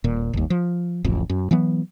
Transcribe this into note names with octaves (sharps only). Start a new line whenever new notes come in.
D#1 A#2
G1 D#2
F3
D1 A1 F2
F#2
E3 F#3 B3